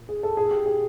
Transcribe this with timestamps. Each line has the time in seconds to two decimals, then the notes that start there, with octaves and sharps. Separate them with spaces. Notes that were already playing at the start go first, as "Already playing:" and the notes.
Already playing: A#2
0.09 G#4
0.23 A4
0.37 A#2 G#4
0.51 G4
0.66 G#4